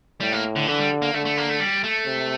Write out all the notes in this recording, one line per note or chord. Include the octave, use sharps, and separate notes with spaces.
A2 G3
A#3
D3
D3 E3
G3
A#3
D3 A3
A3
A#3
A3
G3
A3
C3